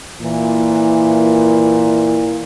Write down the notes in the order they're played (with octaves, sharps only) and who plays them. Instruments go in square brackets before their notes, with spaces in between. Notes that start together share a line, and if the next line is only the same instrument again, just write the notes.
[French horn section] A#2 E3